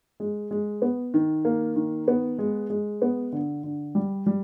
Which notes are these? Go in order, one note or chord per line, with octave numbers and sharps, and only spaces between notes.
G#3
G#3
B3
D#3
A#3
D#3
B3
G#3
G#3
B3
D3
D3
G3
G3